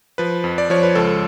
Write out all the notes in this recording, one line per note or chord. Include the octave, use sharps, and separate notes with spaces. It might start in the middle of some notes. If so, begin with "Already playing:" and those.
F3 B4
F2
D5
F3 C#5
B4
C#2 A4